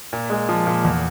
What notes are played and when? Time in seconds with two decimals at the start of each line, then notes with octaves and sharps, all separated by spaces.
0.13 A#2
0.30 G#3
0.49 F3
0.67 A#2
0.84 E2